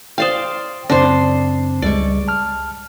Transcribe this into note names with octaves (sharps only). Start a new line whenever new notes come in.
C5 D5 F5 G5 D#6
F#2 C#3 C4 D4 C5
C#2 G3 G#3 D5 C#6
A5 F6